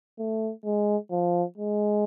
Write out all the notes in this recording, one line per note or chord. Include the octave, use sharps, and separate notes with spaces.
A3
G#3
F3
G#3